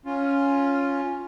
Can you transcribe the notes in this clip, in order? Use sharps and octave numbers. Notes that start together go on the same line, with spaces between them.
C#4 F4